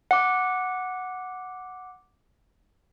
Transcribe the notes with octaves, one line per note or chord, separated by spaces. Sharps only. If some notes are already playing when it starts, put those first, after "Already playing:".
F#5 D6